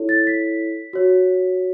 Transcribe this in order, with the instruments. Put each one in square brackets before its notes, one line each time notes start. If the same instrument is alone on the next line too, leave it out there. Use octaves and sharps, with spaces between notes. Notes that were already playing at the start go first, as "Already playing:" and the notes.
Already playing: [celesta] E4 A4 C#5
A6
B6
F#4 C#5